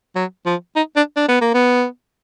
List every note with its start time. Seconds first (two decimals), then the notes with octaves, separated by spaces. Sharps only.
0.16 F#3
0.46 F3
0.76 D#4
0.96 D4
1.16 D4
1.29 B3
1.41 A#3
1.54 B3